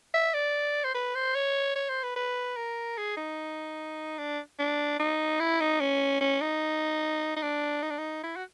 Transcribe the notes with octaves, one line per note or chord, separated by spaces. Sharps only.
E5
D5
C5
B4
C5
C#5
C#5
C5
B4
B4
A#4
G#4
D#4
D4
D4
D#4
E4
D#4
C#4
C#4
D#4
D#4
D4
D#4
D4
D#4
E4
F#4